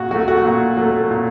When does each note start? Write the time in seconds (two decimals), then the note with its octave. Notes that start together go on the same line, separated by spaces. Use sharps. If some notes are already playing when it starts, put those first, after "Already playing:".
Already playing: A#2 F#4
0.11 F#3 A3 F#4
0.28 F#4
0.45 A#2
0.77 F#3 A3
1.11 A#2